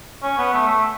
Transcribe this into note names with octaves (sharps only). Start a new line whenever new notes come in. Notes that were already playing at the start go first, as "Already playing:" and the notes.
C#4
B3
A3
A3